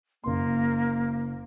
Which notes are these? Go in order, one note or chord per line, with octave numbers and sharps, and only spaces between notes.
F#1 A#3 C6